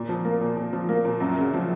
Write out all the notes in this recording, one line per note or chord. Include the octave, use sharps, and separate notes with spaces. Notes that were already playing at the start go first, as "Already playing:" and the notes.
Already playing: A#2
F3
A#3
A#2
A#2
F3
A#3
A#2
F#2
C#3
F3